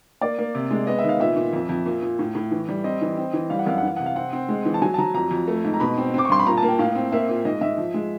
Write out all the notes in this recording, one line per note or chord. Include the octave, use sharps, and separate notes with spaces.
A#3 D5
A#3
C3
G#3
B3 D#5
E5
D#3
F5
A#2 E5
A#2
F2
F2
A#2
A#2
A2
A2
E3
G3
C4 D#5
E3
C4
E3
G3 F5
F#5
F#2 F5
F#5
E3 F5
C3 F#5
F5
C4 F#5
C4
G#3
E3
A5
F#3 G#5
A5
F#3 A#5
F2 A#5
F2
A3
G#2
A#5
B2 B5
C4
C4 D6
C#6
G2 C6
B5
A#2 A#5
A5
A#3
G5
A2 F5
C4
A#3 E5
A#2
G#2 D#5
G#2 E5
F3
G#3